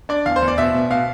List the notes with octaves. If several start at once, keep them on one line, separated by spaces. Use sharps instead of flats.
D4 D5
E2 F5
C5
E2
D5
B2 E5
B2
B2 F5